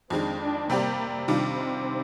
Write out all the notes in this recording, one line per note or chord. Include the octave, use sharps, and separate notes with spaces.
F2 D#3 G#3 C4 D4
D4
C3 G3 A#3 C4 G4 D5
C3 D#3 G3 C4 D4 F4